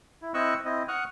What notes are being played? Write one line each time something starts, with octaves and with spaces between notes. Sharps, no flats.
E4
C4 E4 D#5 C#6 E6 F#6
C4 E4 D#5
F#5 C#6 D#6 F6 F#6